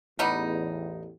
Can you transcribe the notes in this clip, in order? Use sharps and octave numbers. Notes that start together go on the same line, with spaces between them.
A1 E2 G3 B3 D#4